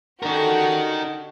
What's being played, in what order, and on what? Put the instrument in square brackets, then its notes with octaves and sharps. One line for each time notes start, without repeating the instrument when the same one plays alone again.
[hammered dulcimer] D3 C#4 [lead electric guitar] D#4 A#4 [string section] F#4 G4